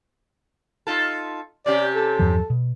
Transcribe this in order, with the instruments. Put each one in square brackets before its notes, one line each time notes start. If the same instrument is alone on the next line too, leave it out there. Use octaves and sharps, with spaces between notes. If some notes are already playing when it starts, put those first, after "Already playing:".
[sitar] D#4 F4 A4
[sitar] C3 C#4 G4 [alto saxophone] D5
[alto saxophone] A4
[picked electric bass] E2 G2 F3
B2